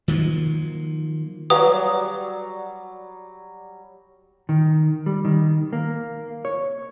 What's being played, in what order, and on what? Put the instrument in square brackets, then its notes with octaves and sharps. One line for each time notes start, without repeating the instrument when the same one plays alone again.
[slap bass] D#3 F3 F#3 A#3
[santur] F#3 G3 [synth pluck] F#4 D5 [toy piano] B4 F5 G#5 [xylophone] D#6
[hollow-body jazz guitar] D#3
G3
D#3
A#3
C#5